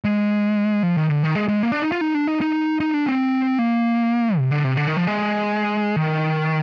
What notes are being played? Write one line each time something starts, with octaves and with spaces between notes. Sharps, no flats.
G#3
F3
D#3
D3
D#3
G#3
G#3
A#3
D4
D#4
F4
D#4
D4
D#4
D#4
D#4
D4
C4
A#3
C3
D3
C3
D3
D#3
F3
G#3
D#3